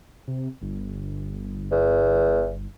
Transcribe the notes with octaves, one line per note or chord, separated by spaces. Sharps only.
C3
G1
E2